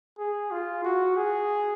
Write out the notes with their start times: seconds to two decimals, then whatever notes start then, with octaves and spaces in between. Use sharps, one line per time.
0.19 G#4
0.51 F4
0.85 F#4
1.17 G#4